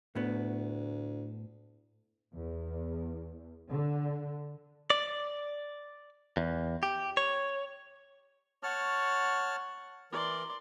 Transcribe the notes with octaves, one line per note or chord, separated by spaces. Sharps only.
D2 A2 B3
E2
D3
D5
E2
G4
C#5
C#5 F#5 A5 C#6 F6
E3 A#4 D5 C6